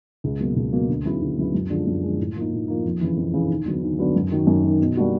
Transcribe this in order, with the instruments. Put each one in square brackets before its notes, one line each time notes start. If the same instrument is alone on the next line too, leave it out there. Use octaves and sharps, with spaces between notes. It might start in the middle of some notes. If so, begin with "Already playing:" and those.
[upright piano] C#2
B2 F#3 A#3
C#2
B2 F#3 A#3
D2
C#3 F#3 B3 E4
D2
C#3 F#3 B3 E4
F#2
D3 F3 G#3
F#2
D3 F3 G#3
A2
F3 A#3 D#4
A2
F3 A#3 D#4
F2
C#3 E3
F2
C#3 E3
D#2
D3 F#3 B3
D#2
D3 F#3 B3
F#2
D#3 F#3
F#2
D#3 F#3
B2
G3 A#3 D4 F#4